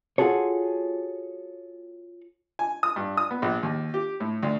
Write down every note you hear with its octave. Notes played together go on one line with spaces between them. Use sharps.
F4 F#4 G#4 A4 C#5
G#5
D#6
G2
D#6
B3
A#1
D#2
G4
A2
D2